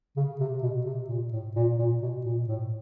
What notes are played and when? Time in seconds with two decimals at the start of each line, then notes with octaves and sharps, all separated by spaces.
0.17 C#3
0.40 C3
0.62 B2
0.86 C3
1.09 A#2
1.33 A2
1.56 A#2
1.79 A#2
2.02 B2
2.25 A#2
2.48 A2